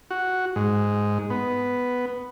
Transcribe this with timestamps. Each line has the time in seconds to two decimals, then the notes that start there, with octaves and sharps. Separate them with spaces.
0.11 F#4
0.56 G#2
1.30 B3